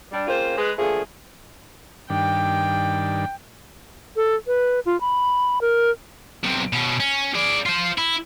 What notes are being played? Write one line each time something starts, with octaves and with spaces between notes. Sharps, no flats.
G3 D4
C#3 A#3 C4 F4 C5
G#3 B4
D3 F3 A3 A#3 G#4
G2 D#3 D4 G5
A4
B4
F4
B5
A#4
B1 C3
B2 C#4
C#4
G#4 D5
F4 C5
E4